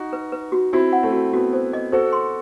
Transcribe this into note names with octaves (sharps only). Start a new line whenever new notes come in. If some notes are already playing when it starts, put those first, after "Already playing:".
Already playing: D#4 F#4
B4
B4
F#4
C4 E4 F#4
F#5
A3 C4
F#4
B3 F#4
C5
D#5
F#4 A4 C5
C6